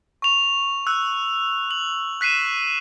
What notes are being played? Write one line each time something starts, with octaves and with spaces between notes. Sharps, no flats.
C#6 F7
E6 F#6
F#7
F#6 B6 C7 D#7 E7